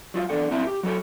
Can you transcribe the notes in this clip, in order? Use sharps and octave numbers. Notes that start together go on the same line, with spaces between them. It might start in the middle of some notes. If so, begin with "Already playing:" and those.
F#3 F4 D#5 F5
E2 A#3 D4 A4 F#5
A#2 C4 E4 E5 A5
G4
F#3 F#4 A4 C#5